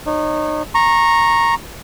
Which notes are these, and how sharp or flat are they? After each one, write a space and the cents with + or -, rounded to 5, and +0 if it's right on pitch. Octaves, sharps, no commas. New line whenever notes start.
D#4 -30 C#5 -20
A#5 +0 C#6 -20